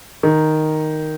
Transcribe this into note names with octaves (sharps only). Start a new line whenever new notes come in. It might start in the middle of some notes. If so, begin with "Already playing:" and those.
D#3